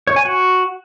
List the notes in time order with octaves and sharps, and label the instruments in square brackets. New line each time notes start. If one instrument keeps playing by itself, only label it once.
[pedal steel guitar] C#5
G#5
F#4